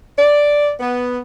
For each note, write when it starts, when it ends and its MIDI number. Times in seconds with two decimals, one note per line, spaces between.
0.17 0.70 74
0.80 1.19 59